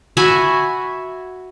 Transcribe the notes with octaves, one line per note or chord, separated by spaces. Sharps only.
F#4 E5 G#5 B5